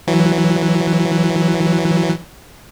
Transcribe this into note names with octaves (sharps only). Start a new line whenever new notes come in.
E3 F#3